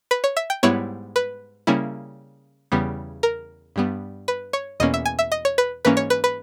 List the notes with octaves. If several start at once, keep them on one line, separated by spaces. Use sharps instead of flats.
B4
C#5
E5
G5
G#2 G3 B3 E4 C#5
B4
C#3 G3 A#3 C#4 E4
E2 C#3 G3 B3
A#4
G2 G3 B3
B4
C#5
E2 B2 A#3 C#4 D#5
E5
G#5
E5
D#5
C#5
B4
G#2 E3 A#3 C#4 B4
C#5
B4
B4